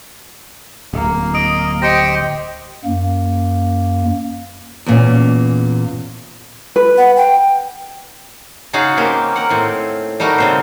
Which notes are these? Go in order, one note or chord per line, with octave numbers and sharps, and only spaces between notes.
D1 A#3
D#5 D#6 D7
G4 C5 D#5 G5 A#6 C#7
F#2 A#3
E2 A#2 C#4
B4
F#5
G5
C#3 D#4 F#4 G#4 F5 F#5
A#3 C4 C#4 G4
A#4 F#5
A2 C4
G3 A3 D#4 F#4 A#4
C#3 C4 C5